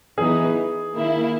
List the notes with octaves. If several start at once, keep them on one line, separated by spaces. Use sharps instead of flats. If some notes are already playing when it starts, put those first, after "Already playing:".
E3 B3 D#4 G#4
D#3 A#3 E4